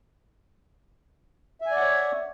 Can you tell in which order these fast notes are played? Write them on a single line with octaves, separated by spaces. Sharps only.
E5 G#5 D5 F#5 C#5